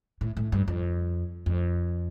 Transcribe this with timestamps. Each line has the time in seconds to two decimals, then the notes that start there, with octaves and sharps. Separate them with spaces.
0.21 A2
0.37 A2
0.52 G2
0.68 F2
1.46 F2